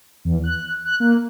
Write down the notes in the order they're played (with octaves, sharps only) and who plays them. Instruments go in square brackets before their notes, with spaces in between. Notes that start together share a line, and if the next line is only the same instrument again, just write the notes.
[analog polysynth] E2
F#6
F#6
A#3